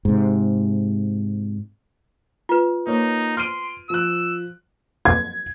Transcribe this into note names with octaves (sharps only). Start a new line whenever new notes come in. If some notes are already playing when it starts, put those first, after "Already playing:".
G#2 C3
F4 B4
A#3 D#4 C#5
C6 F6 D7 D#7
F3 E6 F#6
G#6